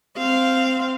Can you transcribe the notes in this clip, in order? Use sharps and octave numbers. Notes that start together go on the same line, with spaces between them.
C4 F5